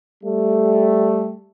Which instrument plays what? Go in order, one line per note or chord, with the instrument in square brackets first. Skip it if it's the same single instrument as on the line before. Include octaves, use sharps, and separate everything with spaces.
[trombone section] G3 A3